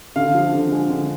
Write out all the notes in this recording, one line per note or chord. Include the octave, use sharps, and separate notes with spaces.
D3 F5
F3
D3
G#3
D3